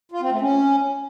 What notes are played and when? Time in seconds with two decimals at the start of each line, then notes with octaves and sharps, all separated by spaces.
0.12 F4
0.21 C4
0.31 A3
0.41 C#4